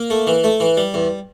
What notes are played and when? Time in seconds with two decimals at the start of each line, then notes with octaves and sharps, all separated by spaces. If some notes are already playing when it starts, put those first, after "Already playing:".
Already playing: A#3
0.10 A3
0.27 E3
0.44 A3
0.60 E3
0.77 G3
0.94 E2